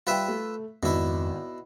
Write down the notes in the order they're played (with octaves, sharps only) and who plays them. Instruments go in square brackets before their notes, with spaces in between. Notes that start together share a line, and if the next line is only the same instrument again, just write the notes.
[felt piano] G3 G5 [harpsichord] F4 B4 E5
[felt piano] A3
[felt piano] G#1 [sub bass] F2 [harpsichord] B2 E4